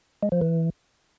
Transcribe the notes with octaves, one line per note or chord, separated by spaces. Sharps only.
G#3
F3
E3